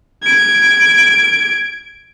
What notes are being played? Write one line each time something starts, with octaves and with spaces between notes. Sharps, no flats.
G#6 D7